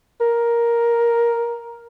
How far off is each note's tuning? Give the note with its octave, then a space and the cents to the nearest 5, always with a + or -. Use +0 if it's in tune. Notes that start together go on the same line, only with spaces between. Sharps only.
A#4 +5